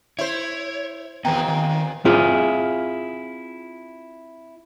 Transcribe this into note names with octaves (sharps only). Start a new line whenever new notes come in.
E4 C5 C#5
D#2 A#2 E3 B3 C4 G5 A#5
D#3
C4 E4 F4 G#4